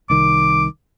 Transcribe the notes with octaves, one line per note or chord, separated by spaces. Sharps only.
C2 D#3 D6